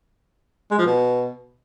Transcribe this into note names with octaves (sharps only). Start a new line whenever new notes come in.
G#3
F3
B2